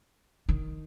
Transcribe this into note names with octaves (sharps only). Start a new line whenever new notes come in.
D#3